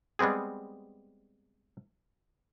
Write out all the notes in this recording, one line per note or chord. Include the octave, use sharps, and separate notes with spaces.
G3 G#3 B3 C4 G#4